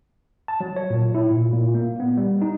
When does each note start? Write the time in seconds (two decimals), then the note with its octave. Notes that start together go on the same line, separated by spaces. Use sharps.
0.48 A5
0.61 F#3
0.76 C#5
0.90 A#2
1.15 E4
1.31 A#2
1.53 A#2
1.75 A#3
2.00 B3
2.17 G3
2.42 D#4